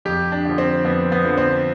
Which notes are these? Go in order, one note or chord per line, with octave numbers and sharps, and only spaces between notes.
F2 G4
D4
D3 F3
C4
F2 B3
B3
D3 F3
C4